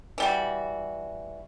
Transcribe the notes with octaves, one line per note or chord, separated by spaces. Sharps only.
E3 G3 F#4